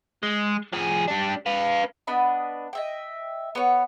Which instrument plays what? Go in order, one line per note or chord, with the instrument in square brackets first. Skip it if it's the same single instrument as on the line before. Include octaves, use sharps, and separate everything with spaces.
[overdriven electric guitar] G#3
F3 G#4
G3 D4
B4 F5
[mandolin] B3 D4 D#5 B5
D#5 E5 G5
B3 C#5